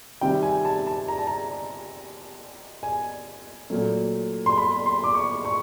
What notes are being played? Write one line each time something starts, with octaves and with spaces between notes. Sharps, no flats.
C3 D#3 G3 G5
G#5
A5
A5
A#5
A5
A#5
G#5
A#2 F#3 A3
C6
B5
C6
D6
C#6
C#6